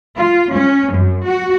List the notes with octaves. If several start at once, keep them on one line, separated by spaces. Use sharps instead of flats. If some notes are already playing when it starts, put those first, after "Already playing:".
F4
C#4
F#2
F#4